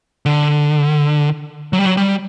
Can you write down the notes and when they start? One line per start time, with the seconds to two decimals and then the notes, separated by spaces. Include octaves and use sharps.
0.26 D3
1.73 F#3
1.79 G3
1.86 F#3
1.97 G3